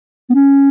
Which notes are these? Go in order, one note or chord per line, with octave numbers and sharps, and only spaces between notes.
B3
C#4